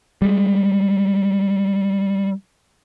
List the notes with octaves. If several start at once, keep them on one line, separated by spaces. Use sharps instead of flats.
G3 G#3